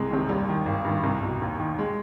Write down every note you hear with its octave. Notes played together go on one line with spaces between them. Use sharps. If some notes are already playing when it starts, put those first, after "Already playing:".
Already playing: C2 G#3
C3 D#3
D#2 G3
D#3
G#1
G2 D#3
C2
B2
D#2
D#3
G#3